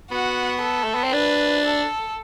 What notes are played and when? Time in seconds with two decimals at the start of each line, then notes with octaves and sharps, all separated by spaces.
0.11 B3 F#4
0.62 A4
0.84 A3
0.95 B3
1.03 C4
1.13 D4 B4
1.66 A4